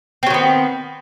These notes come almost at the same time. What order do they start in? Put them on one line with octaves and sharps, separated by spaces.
C4 F#3 D#3 B3